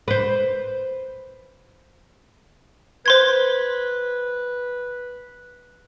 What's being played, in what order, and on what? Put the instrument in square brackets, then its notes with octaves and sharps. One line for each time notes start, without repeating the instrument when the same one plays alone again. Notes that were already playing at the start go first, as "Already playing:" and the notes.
[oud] B4 C5
[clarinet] B4 [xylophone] C5 C6 G#6